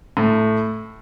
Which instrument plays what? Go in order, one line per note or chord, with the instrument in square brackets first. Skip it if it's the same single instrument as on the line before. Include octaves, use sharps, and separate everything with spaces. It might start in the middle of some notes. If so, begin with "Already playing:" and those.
[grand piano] A2